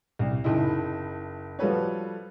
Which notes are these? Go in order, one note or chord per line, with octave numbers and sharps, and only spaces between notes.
C2
F#1 D#4 E4
F3 G3 F#4 A4 B4 C#5